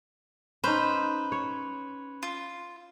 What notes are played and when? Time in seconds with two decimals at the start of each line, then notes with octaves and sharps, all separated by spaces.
0.64 C#4 D#4 B4 C5 B5
1.32 C#5
2.23 F4